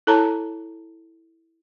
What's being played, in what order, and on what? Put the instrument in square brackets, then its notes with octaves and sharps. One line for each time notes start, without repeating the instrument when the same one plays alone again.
[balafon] E4 A4 C#5 A5 A#5